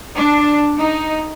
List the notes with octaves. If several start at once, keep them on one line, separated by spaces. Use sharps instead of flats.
D4
D#4